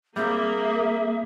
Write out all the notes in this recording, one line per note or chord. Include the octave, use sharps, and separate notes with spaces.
G3 A#3 C4 G#4 E5